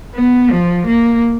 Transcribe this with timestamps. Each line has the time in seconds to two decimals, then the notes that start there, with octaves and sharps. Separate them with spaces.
0.15 B3
0.50 F3
0.86 A#3